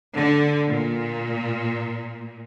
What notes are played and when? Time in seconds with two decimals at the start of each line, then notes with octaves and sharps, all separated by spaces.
0.15 D3
0.68 A#2